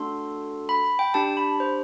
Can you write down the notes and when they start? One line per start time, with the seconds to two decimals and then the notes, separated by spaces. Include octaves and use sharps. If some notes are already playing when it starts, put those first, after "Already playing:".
Already playing: A3 D4 F#4 A4 C6
0.69 B5
0.84 B5
0.99 G5
1.14 D4 G4 A5
1.37 B5
1.60 C5